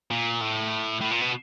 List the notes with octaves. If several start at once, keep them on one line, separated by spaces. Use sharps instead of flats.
A#2
A2
A2
A#2
B2